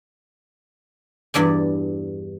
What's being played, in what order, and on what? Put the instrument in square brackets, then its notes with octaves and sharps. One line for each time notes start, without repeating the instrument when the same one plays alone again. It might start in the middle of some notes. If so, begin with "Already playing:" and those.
[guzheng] E2 G2 D5 G#5